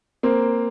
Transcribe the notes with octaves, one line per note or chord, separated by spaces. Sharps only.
A#3 C4